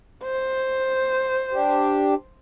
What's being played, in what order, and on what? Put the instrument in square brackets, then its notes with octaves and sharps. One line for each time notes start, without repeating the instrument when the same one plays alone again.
[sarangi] C5
[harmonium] D4 G4